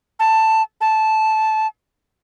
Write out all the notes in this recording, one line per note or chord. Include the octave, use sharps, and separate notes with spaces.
A5
A5